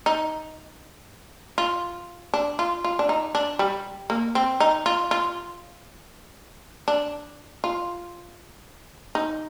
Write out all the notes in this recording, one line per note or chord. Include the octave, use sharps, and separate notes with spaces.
D#4
F4
D4
F4
F4
D4
D#4
D4
G3
A#3
C4
D#4
F4
F4
D4
F4
D#4